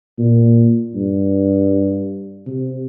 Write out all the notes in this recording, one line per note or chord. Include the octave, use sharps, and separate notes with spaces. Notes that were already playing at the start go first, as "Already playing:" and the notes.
A#2
G2
C3